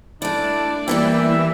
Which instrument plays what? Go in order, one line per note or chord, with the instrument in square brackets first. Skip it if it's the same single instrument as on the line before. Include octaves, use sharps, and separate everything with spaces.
[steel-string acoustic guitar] A3 E4 [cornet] D4 [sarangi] D5
[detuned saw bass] E3 [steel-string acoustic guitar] G3 A#3 G5 [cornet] E5